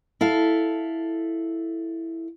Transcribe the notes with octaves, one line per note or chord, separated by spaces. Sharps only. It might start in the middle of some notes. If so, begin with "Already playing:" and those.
E4 A4 F5